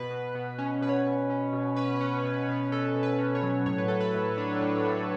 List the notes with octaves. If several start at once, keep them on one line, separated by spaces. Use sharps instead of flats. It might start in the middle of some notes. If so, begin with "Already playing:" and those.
Already playing: B2 B4
B2
B2
C#4
B2 B4
C#5
B4
B2
C#4
B2
C#4 B4
C#4
B2
B2
B2 A4
B2
B4
C#4
C#5
F#3
A2 C#5
B4
A2 A4
B4
A2
D4
A2
A2